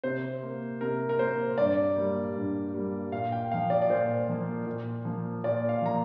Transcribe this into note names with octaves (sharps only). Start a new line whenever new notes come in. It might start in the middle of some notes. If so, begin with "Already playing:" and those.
C3 C5
A#3
C3 A#4
A#4
A#3 C5
G2 D5
G3 A#3
G2
G3 A#3
A#2 F5
G5
F3 A#3 F5
D5
D5
A#2 C5
F3 A#3
A#2
F3 A#3
A#2 D5
F5
F3 A#3 A#5